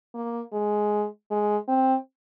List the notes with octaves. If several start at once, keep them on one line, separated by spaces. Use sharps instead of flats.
A#3
G#3
G#3
C4